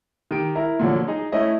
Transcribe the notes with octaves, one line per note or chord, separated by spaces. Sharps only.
D#3 G4 D7
E4 A#4
A#2 D3 F3 F#3
D#4 G#4 D#5
A3 C#4 E4 D#5